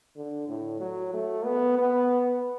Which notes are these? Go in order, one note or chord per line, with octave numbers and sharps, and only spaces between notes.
D3
A2
F#3
A3
B3
B3